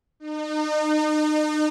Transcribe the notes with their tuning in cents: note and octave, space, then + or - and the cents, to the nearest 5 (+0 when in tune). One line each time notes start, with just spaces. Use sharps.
D#4 -35